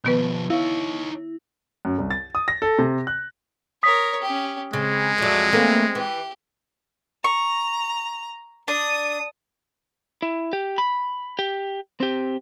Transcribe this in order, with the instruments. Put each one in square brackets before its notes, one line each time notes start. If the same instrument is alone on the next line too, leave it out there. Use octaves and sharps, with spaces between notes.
[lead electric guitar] B2 F3 [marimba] D#3 B3 B4
[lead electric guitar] D#4 C#5 [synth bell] E4 [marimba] F5
[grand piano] F#2
C2
A6
D#6
A#6
A4
C3
F#6
[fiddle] A#4 C#5 [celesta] D#6 B6
[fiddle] C#4 G4
[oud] C#3 [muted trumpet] G#3 [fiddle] C4
[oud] F2 F#3 [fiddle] A3 D5
[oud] E3 A3 A#3 [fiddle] C4
[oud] E3 [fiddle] G4
[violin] A#5 [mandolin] C#6
[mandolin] D4 [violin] D#6
[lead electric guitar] E4
G4
B5
G4
C4 G4